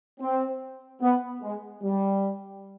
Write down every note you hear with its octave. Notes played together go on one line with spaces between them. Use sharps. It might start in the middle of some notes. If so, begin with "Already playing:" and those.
C4
B3
G#3
G3